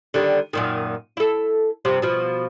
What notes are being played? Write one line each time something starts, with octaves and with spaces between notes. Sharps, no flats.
D3 D#3 G3
F#2 A#2 D#3
E4 A4
G2 C3 F3
B2 F3